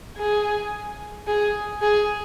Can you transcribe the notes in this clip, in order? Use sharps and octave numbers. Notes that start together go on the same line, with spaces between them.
G#4
G#4
G#4